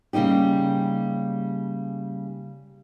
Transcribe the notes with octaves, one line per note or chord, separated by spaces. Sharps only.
C#3 G3 A#3 D#4 G4